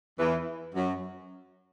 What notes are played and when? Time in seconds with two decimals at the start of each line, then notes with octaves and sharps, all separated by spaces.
0.18 E2 E3
0.75 F#2 F#3